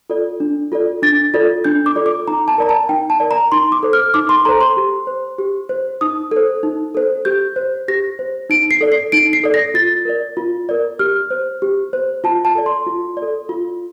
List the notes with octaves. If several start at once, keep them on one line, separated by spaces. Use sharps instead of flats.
F4 A4 D5
D4
F4 A4 D5
D4 A6
F4 A4 D5
D4 G6
D6
F4 A4 D5
D6
D#4 A#5
A5
A#4 D5 A#5
A5
D#4 G5
A5
A#4 D5
A#5
D#4 C6
D6
A4 C5
F6
D#4 D6
C6
A4 C5 A#5
C6
G4
C5
G4
C5
D#4 D#6
A4 C5
D#4
A4 C5
G4 G6
C5
G4 A#6
C5
D#4 D7
C7
A4 D5
C7
D#4 D7
C7
A4 D5
A#6
F4 A6
A#4 D5
F4
A#4 D5
G4 F6
C5
G4
C5
F4 A5
A5
A4 D5
C6
F4
D5
A4
F4